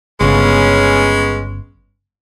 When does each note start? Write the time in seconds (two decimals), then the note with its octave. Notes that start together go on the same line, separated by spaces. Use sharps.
0.21 G1 C#3 G#3 B3 C#4